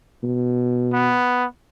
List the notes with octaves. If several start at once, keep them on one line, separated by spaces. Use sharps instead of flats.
B2
B3